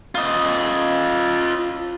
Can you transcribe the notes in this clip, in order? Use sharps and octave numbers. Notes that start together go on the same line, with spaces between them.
F4 D#5